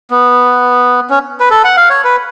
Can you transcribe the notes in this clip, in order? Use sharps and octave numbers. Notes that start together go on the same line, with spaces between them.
B3
C#4
B4
A4
F#5
F5
C#5
B4